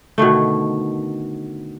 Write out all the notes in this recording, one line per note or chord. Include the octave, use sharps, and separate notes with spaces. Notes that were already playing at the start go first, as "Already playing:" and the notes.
B2 D3 D#3 A3